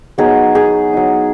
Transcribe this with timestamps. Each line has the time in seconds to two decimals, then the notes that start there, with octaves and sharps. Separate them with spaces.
0.18 F#3 B3 D#4 G#4
0.55 G#4
0.93 F#3 D#4